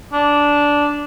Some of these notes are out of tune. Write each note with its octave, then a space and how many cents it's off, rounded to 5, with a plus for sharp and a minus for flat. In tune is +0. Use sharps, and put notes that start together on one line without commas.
D4 -10